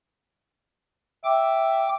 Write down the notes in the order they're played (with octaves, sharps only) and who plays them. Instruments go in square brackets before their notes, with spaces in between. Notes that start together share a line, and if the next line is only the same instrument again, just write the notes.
[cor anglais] E5 [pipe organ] G5 D6